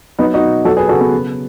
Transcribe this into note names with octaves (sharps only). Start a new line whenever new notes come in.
F#3 B3 D#4
D#4 F#4
B2
F#3 F#4 A4
G#4 B4
C#3 F#4 A4
B3
F#3